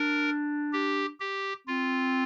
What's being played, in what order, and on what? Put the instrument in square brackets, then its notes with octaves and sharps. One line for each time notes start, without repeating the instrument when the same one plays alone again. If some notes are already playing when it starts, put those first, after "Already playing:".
Already playing: [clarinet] D4 [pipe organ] A#4
[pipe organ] G4
G4
[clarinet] C4 [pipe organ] F4